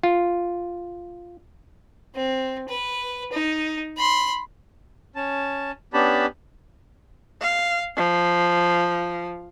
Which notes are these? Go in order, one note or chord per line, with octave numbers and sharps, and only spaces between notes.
F4
C4
B4
D#4
B5 C6
C#4 A5
B3 C#4 D4 G4 A5 B5
F5
F3